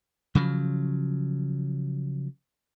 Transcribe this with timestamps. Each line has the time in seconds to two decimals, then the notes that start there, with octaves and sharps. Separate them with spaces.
0.35 C#3 F3 F#3